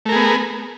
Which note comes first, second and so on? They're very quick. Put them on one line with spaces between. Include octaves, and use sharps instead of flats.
A3 A#4 G#4 B3